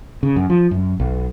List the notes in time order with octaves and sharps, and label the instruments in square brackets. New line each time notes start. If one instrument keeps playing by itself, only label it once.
[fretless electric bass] C#3
F#2
F3
F#2
B1